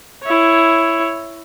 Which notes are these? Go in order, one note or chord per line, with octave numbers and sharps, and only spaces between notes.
E4 C#5